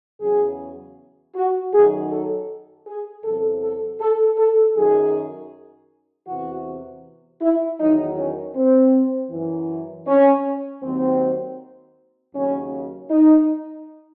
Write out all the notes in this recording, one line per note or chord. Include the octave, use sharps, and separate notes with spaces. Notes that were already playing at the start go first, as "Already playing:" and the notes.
E2 C#3 F#3 G#4
F#4
F#2 D#3 F#3 G#4
A4
G#4
E2 C3 F#3 A4
A4
A4
A4
F#2 D#3 F#3 G#4
E2 C3 E3 F#4
E4
E2 D#3 F#3 D#4
C#4
C4
F#2 E3
C#4
D#2 D#3 F#3 C4
D#2 C#3 F#3 C#4
D#4